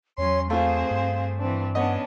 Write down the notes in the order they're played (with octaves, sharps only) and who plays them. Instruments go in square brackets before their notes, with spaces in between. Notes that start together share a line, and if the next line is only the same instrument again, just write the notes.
[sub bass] E2 [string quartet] F#3 C#4 C6 [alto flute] C#5
[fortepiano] A3 F4 [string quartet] C4 G#4 C5 [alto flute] F5
[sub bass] G2
[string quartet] E3 C4 D4
[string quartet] B3 C#4 D4 [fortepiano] C#5 D#5 [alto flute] F#5